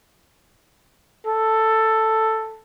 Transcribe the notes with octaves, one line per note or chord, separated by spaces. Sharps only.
A4